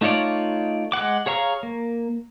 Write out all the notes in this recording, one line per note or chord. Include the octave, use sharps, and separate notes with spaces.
A3 D#4 F4 C#5 D5
G#3 A#4 F#5 D6
G#4 C#5 F5 A#5 C#6
A#3